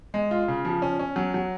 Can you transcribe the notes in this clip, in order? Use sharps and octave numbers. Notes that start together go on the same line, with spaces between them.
G#3
F4
C#3
F3
C#4
C#4
F#3
F#3